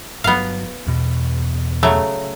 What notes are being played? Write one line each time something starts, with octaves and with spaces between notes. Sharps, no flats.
G1 F#3 B3 F5
E2 B2
C#3 F#3 A3